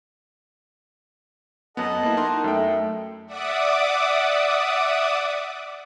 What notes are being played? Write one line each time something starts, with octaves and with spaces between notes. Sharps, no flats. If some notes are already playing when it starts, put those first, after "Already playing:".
F#2 B3 A4 D#5 F#5
A#3 E4
D#4 A#4 C6
F#2 A3 G5
D5 E5 F#5 D6 D#6